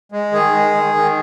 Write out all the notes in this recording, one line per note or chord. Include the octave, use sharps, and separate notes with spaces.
G#3
D#3 G#4
G#3
D#3
D#3